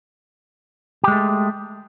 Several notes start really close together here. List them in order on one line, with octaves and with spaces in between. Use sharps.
G4 G#3 A3